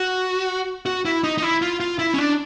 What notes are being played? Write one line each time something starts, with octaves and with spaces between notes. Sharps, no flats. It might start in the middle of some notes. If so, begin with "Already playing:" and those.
Already playing: F#4
F#4
E4
D#4
D#4
E4
F4
F4
E4
C#4
D4